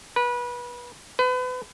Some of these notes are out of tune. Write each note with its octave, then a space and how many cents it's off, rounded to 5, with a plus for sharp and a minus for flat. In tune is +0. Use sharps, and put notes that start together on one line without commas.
B4 -25
B4 +35